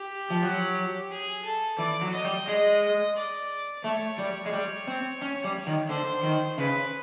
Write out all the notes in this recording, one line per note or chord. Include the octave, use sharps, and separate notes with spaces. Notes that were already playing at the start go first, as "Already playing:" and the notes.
Already playing: G4
F3
F#3
G#4
A4
E3 D5
F#3
D#5
G3
G#3 D#5
D5
A3 C#5
G3
G#3
G3
C4
C#4
G3
D#3
D3 C5
D#3
C#3 B4